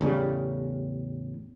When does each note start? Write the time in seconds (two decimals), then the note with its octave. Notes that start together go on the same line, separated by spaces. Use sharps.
0.01 A1 E2 C#3 G3